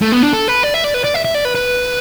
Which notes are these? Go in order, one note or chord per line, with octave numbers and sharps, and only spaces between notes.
A3
B3
D4
A4
B4
D5
E5
D5
B4
D5
E5
E5
D5
B4
B4